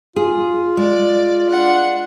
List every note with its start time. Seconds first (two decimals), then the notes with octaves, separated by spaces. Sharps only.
0.16 F4 G#4
0.77 G#3 D5
1.50 D4 F#5